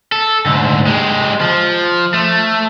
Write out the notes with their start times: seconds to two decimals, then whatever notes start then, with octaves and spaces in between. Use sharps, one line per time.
0.12 A4
0.46 D2 G#2
0.86 G#3 G4
1.41 F3
2.14 A3